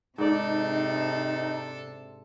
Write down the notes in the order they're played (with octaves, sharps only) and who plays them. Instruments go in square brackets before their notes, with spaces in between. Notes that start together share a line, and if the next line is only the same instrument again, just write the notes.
[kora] G#2 D5 [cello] C3 [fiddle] D4 A4 [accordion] D#4